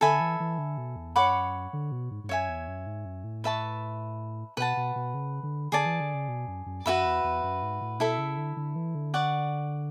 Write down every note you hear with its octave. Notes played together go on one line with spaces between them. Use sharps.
D3 A4 E5 G#5 B5
E3
E3
D3
B2
E2
F#2 C#5 F#5 B5 D6
D3
B2
G#2
G#2
F#2 C#5 E5 G#5
E2
F#2
G#2
F#2
A2
B4 E5 A5 C#6
B2 B4 F#5 A5
B2
B2
C#3
D3
D3 G#4 D5 A5
E3
D3
C#3
B2
F#2
F#2
F#2 F#4 B4 E5 B5
E2
E2
F#2
G#2
A2
B2 E4 A4 E5
C#3
D3
D3
E3
D3
D5 F#5 C#6